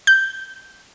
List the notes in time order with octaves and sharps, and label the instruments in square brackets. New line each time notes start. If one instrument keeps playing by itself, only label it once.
[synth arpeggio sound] G6